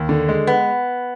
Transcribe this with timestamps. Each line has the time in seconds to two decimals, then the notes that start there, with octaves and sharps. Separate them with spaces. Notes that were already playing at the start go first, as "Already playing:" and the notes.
Already playing: D#2
0.09 D3
0.29 G#3
0.47 B3